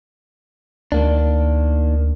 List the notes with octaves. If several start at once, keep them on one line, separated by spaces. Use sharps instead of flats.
D2 D#3 A#3 D4